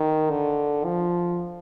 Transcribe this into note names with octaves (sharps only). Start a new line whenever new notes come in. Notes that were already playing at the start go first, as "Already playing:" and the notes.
Already playing: D#3
D3
F3